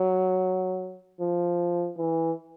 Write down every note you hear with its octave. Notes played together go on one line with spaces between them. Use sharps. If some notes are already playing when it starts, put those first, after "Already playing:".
Already playing: F#3
F3
E3